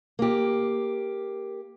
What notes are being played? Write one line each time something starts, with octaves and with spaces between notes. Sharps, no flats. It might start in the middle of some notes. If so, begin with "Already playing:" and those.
A#3 G4